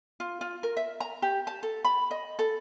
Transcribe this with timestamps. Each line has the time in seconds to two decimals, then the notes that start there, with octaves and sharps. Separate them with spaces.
0.20 F4
0.41 F4
0.63 A#4
0.77 E5
1.00 A#5
1.22 G4
1.47 A5
1.63 A4
1.85 B5
2.11 D#5
2.39 A4